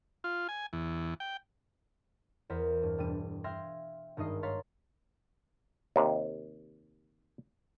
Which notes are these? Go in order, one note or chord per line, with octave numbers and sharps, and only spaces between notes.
F4
G#5
E2
G5
E2 A#4 C5 B6
G2
E1 G3 D4 D#7
E5 F5 G5 C6 G#6 A#6
G#1 G2 D#4 D#5 C7
C#5 F5 A#5 C6 A6 B6
D#2 C3